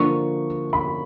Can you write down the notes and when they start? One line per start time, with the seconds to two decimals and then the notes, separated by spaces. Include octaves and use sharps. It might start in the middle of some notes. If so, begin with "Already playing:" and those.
Already playing: D3 F3 A#3 D4 C#6
0.73 B5